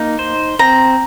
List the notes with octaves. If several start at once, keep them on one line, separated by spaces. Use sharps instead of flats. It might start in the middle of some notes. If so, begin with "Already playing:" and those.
Already playing: A#3 D#4
C5
C4 A#5